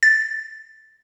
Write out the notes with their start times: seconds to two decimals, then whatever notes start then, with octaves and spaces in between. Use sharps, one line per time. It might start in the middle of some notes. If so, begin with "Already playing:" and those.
0.03 A6